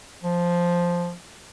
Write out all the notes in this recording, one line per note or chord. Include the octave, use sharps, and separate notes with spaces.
F3